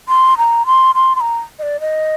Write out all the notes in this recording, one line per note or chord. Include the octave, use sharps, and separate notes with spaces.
C6
A#5
C6
C6
C6
A#5
D#5
D5
D#5